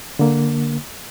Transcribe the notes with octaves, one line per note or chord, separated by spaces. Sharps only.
D3 A#3